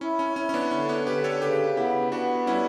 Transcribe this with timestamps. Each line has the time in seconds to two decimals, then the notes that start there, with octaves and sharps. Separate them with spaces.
0.01 C#4 E4
0.19 C#4
0.36 C#4 E4
0.49 C#4
0.54 B3 D4
0.71 D3 C#4
0.89 B3 D4
1.07 D3 G4 B4
1.24 A4 C#5
1.42 C#3 G4 B4
1.77 B3 E4 G4
2.12 B3 D4 F#4
2.47 G3 C#4 E4